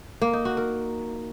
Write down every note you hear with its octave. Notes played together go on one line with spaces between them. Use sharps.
A#3
D#4
F#4
A#4